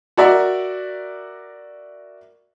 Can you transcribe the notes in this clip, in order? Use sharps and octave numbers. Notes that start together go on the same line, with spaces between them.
F#4 A#4 D5 E5